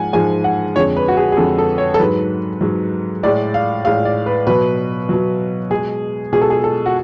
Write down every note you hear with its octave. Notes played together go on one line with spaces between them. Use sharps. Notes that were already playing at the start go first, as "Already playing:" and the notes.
Already playing: G#2 F3 G#3 F#5 G#5
G#2 F3 G#3 G#5
F#5
F2 D3 G#3 C#5
B4
F#4
G#4
G#4
F2 D3 G#3 A4
A4
C#5
A4
G#2 F#3 B4
G#2 F#3
A2 G#3 D5
F5
A2 G#3 F5
D5
B4
B2 F#3 B4
B2 F#3
B2 G#3 G#4
B2 G#3 G#4
A4
G#4
A4
F#4